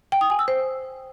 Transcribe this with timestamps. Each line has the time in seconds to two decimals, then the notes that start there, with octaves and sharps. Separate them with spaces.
0.12 G5
0.21 D#6
0.30 G#5
0.39 E6
0.48 C5